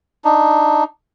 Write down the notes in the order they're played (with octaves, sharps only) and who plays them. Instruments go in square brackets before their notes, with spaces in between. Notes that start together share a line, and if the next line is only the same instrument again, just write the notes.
[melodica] D4 D#4